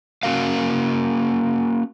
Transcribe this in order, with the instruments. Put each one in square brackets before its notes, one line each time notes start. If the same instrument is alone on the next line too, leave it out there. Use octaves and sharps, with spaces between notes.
[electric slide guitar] A#3 C#4 F#4 A#4 F5